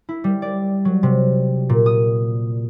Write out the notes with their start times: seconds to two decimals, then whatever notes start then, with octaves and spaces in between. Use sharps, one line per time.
0.09 E4
0.24 G3
0.42 D5
0.85 F#3
1.03 C3
1.69 A#2
1.86 D#6